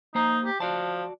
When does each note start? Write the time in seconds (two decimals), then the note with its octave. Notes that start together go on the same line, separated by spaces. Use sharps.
0.15 A#3 D#4 C5 A#5
0.45 G4
0.60 F3 F#4 D5 A5